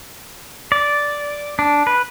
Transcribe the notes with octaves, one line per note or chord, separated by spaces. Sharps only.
D5
D4
B4